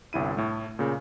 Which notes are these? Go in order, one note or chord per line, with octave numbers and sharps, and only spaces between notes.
G1 C2 E4 D#7
A2 A3
A#2 C#3